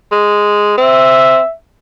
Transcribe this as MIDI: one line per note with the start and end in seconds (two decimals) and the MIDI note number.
0.12 0.76 56
0.78 1.39 60
0.78 1.52 76